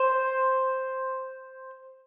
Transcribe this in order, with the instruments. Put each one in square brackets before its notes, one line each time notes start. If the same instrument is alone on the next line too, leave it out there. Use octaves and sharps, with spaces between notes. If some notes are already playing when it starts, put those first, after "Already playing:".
Already playing: [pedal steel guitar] C5